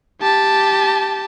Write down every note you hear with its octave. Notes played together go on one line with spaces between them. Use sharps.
G4 A5